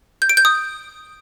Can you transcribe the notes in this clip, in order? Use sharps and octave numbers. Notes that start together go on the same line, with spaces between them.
G6
D7
G6
D#6